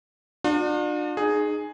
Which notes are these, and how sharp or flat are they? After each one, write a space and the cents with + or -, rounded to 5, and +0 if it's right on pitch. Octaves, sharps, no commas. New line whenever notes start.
D4 +35 F4 +45
D#4 -25 G#4 +5